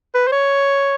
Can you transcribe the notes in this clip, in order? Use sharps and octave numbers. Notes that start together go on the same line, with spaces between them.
B4
C5
C#5